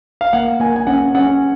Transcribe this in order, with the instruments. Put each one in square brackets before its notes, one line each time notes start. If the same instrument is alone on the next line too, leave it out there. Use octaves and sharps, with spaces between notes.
[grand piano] F5
[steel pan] A#3 [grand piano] F#5
[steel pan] A#3 [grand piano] G#5
[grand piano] G#5
[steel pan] C#4 [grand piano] F#5
[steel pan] C#4 [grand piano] F#5